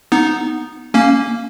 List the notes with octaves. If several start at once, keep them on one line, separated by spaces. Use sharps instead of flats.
B3 D#4
A#3 C#4